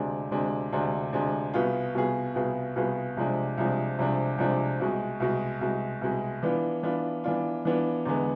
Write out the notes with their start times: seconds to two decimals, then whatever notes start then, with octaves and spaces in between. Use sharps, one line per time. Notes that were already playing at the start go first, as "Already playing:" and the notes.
Already playing: D2 C3 G#3 D4
0.31 D2 C3 G#3 D4
0.72 D2 C3 G#3 D4
1.13 D2 C3 G#3 D4
1.54 C2 B2 B3 F4 G#4
1.95 C2 B2 B3 F4 G#4
2.35 C2 B2 B3 F4 G#4
2.76 C2 B2 B3 F4 G#4
3.17 C2 C3 F3 G#3 D4
3.58 C2 C3 F3 G#3 D4
3.98 C2 C3 F3 G#3 D4
4.38 C2 C3 F3 G#3 D4
4.80 C2 B2 G#3
5.20 C2 B2 G#3
5.61 C2 B2 G#3
6.01 C2 B2 G#3
6.43 E3 B3 D4 F4
6.83 E3 B3 D4 F4
7.24 E3 B3 D4 F4
7.65 E3 B3 D4 F4
8.05 E2 D3 G#3 B3